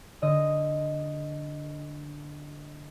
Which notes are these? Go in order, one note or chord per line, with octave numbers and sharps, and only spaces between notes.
D3 D#5